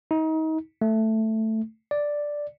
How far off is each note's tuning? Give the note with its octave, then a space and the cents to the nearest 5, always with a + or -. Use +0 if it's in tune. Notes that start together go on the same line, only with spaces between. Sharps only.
D#4 +30
A3 +5
D5 +0